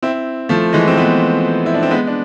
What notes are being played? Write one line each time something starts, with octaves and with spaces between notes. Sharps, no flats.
C4 E4
F3 A3
E3 G#3
C4
G#3 B3
E4
D4
C4
G#3 B3
D4